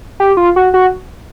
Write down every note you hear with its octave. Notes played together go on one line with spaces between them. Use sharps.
G4
F4
F#4
F#4